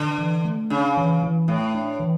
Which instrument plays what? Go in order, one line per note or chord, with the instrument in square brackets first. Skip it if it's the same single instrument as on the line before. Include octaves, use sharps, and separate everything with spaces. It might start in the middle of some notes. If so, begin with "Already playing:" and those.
Already playing: [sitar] D3
[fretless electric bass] E3
A3
[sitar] C#3 [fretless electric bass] D4
[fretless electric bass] E3
E3
[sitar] A2 [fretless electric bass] A3
[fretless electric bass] D4
E3